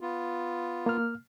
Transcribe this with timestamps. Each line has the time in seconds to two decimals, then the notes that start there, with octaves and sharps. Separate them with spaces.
0.01 B3 F4
0.86 A#3 F6